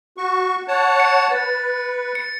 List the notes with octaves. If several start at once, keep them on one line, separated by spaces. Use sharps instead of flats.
F#4 C#6
C#5 F#5 A5
C#7
B4 A6
C#7